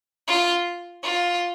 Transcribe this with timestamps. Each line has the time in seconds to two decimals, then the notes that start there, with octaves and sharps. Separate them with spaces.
0.28 F4
1.03 F4